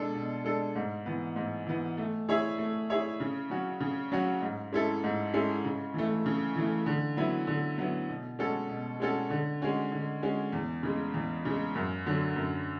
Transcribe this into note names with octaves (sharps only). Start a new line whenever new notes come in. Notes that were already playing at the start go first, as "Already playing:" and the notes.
Already playing: B2 G#3 D4 A4
B2
G#3 D4 A4
G#2
E3 B3
G#2
E3 B3
A3
E4 G#4 C#5 E5
A3
E4 G#4 C#5 E5
C#3
F#3 C#4 F#4
C#3
F#3 C#4 F#4
G#2
G#3 C#4 E4 A4
G#2
G#3 C#4 E4 A4
C#3
E3 A3
C#3
E3 A3
D3
F#3 B3 E4
D3
F#3 B3 E4
B2
G#3 C#4 F#4 A4
B2
G#3 C#4 F#4 A4
D3
G#3 C#4 F#4
D3
G#3 C#4 F#4
E2
C#3 G#3
E2
C#3 G#3
F#2
D3 F#3
F#2